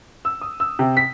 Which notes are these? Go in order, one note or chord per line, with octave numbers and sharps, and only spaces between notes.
E6
D#6
E6
C3
B6